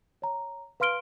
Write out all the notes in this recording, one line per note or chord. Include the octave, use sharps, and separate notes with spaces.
C#5 A#5
B4 F5 C6 F6 D7 G7